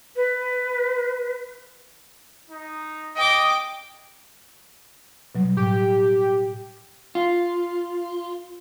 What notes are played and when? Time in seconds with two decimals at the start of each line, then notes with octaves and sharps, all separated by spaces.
0.16 B4
2.50 D#4
3.16 D#5 G5 D6
5.35 B2 F#3 G3
5.57 A2 G4
7.15 F4